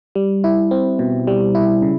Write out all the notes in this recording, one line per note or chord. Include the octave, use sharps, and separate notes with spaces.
G3
E4
C4
B2
G3
E4
C#3